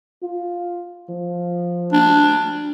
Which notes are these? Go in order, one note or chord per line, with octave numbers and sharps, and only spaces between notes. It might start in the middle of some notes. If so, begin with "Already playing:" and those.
F4
F3
D4